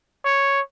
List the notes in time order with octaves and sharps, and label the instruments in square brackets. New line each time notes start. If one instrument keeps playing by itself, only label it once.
[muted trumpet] C#5